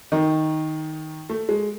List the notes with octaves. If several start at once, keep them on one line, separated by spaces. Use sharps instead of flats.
D#3 D#4
A3
G#3